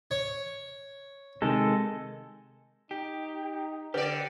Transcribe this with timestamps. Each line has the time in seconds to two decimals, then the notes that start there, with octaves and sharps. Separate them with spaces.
0.11 C#5
1.42 C3 D#3 G#3 A4
2.91 D#4 G4
3.94 D3 G4 B4 D5